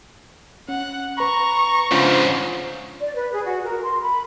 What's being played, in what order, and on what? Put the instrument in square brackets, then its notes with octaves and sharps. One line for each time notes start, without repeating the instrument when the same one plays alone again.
[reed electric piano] C#4 [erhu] F#5
[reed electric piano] B4 B5 [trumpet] A#5 [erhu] C#6
[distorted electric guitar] G#2 C#3 [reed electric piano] C#4 D4 F4 [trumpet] C5
[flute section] D5
B4
G#4
F#4
A#4
C6
B5